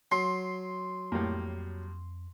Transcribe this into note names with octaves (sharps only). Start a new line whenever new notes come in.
F#3 C6
F2 A2 G3 A#3